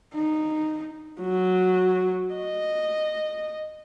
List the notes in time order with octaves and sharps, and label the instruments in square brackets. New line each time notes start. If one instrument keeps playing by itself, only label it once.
[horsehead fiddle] D#4
[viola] F#3
D#5